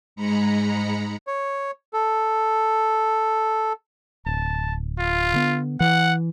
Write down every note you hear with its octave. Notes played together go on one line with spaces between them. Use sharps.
G#2 G#3 A#5 B5 C#7
C#5
A4
D1 A5
F4
D3 B3
E3 F#5